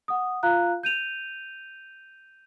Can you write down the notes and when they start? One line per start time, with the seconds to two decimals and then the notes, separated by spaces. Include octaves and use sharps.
0.08 F#5 D#6
0.43 F4 F5 A#5 F#6
0.83 G6 D#7 F7